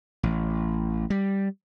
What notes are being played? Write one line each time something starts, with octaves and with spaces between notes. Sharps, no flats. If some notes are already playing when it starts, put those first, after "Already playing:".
A1
G3